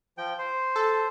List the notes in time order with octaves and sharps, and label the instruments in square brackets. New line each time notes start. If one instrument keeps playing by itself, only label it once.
[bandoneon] F3 G5
C5
[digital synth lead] A4